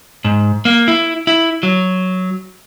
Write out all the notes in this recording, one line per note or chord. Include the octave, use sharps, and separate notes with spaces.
G#2
A#3
E4
E4
F#3